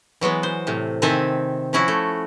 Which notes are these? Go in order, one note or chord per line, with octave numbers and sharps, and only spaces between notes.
E3 F#3 G#3 B3
C5
A2 C3
C3 D#3 C4 E5 G#5 A5
F3 C#4 E4 F#4
A3